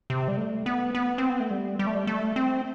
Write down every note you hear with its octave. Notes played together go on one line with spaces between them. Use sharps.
C3
G3
A3
B3
B3
C4
B3
A3
G3
G3
A3
G3
A3
C4